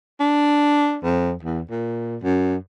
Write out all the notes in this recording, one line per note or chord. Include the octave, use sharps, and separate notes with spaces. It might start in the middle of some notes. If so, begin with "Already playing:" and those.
D4
F2
E2
A#2
F#2